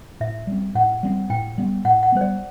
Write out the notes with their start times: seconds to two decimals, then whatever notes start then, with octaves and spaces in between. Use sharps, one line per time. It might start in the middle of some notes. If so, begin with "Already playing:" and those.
0.20 A2 E5
0.47 G3 C4
0.75 A2 F#5
1.03 G3 C4
1.30 A2 G5
1.58 G3 B3
1.85 A2 F#5
2.03 F#5
2.12 G3 B3 C5
2.21 D5